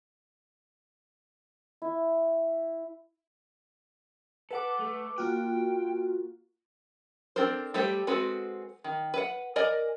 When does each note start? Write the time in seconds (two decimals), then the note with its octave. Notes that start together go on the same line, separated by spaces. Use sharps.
1.82 E4
4.51 A4 B4 F#5 D6
4.79 A3
5.18 A#3 F4 F#4 G5
7.36 C4 D4 A4 A#4 C5
7.74 G3 A3 G4 A4 C5
8.07 G#3 C4 F#4 A4 B4
8.84 D#3
9.14 B4 F#5
9.56 A#4 D5 D#5 G#5